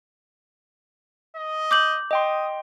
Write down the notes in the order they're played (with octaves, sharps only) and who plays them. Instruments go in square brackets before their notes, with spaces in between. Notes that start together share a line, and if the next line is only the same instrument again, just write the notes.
[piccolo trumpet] D#5
[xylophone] D6 G6 F#7
[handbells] D#5 G5 C6 [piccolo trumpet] D#6